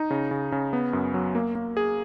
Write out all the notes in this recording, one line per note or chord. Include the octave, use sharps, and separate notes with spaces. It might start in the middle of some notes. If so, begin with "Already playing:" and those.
Already playing: D#4
C#3
C#3
C#3
B3
F#2
F#3
A#3
A#3
G#4